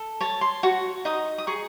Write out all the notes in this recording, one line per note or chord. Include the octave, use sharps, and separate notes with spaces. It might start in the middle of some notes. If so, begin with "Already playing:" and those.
Already playing: A4
C#5 A5
C6
F#4 C#6
D#4 D#6
D#6
G#4 C#6